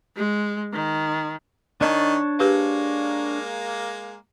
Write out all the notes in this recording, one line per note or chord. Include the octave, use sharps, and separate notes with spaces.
G#3
D#3
D#3 D4 C#5 A5
G#3 A#3 G4 B4